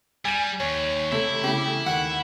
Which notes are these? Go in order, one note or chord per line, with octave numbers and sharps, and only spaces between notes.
G3 G#5 G#6 D#7
D#2 C#5
C3 A3 E4 A4
C#3 E3 A3 G4
D#2 F#5